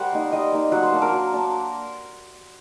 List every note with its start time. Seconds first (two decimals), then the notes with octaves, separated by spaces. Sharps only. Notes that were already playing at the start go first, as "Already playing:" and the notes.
Already playing: G3 A#4 C5 F#5
0.13 A#3 D#4
0.32 G3 D#5
0.52 A#3 D#4
0.72 F#3 F#5
0.83 C5
0.92 A#3 D4
1.02 A#4
1.12 F#3
1.32 A#3 D4